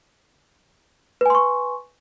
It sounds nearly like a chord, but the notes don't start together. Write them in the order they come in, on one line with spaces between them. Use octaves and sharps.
B4 G#5 C6 C#6